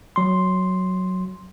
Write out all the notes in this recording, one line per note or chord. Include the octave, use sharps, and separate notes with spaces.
F#3 C6